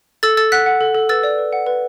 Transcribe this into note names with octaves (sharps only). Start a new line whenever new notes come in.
A4 E6 A6
A4 E6 A6
F#5 F#6 B6
F#5
A4
A4
B4 E6 A6
D5
B4
F#5
B4